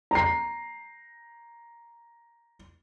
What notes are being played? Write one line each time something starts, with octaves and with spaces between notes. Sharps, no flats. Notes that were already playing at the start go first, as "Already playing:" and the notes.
A#5 C7